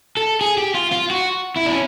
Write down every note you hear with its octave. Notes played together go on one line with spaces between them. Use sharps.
A4
G#4
G4
F4
F4
F#4
E4
D4
C#4